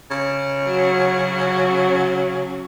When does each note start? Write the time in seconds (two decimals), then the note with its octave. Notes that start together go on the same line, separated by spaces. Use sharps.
0.10 C#3
0.65 F#3 F#4